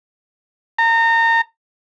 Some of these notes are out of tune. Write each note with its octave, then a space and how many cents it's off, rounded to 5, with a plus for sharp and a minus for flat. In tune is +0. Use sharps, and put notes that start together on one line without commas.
A#5 -30